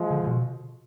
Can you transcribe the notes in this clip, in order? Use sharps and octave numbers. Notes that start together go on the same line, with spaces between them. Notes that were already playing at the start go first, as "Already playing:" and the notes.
Already playing: F3 G#3
D3
D3
B2